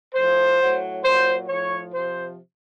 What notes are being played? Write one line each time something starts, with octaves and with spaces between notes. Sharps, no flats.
A2 F3 C5
A2 F#3
A#2 F#3 C5
A2 F3 C#5
C3 F3 C5